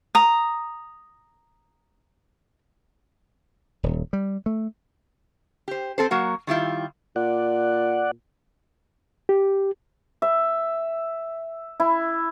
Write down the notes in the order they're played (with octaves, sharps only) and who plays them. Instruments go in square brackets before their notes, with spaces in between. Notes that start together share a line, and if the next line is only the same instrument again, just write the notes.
[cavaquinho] A#5 D#6
[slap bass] D#1
G3
A3
[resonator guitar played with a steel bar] G4 C5
C4 A4 C5
F#3 A#3 F#4
D#3 G3 E4 F4
[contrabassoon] A#2 [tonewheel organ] D5 F#5
[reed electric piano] G4
[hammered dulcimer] E5
E4